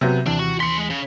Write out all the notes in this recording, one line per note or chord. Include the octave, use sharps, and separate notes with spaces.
C3 F#3 B3 E5 G6
D#2 C3 E3 D4
F#4
C#4 C6 B6 C#7
G#3
C#3